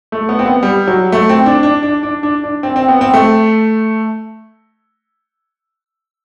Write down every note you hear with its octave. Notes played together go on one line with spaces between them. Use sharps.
A3
B3
C4
B3
G3
F#3
A3
C4
D4
D4
D4
D4
D4
D4
C4
C4
B3
C4
A3